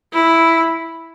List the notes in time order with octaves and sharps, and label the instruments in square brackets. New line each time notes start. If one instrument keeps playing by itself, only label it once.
[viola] E4